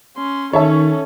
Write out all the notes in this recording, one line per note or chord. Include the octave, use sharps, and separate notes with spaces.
C#4 C6
D#3 C#4 A4 C#5 E5 A5